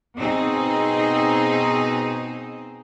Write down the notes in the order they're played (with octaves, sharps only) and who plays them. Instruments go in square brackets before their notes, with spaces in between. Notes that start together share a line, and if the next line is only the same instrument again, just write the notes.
[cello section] B2 C4 D#4 G#4